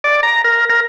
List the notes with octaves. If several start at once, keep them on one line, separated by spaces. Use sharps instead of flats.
D5
A#5
A#4
A#4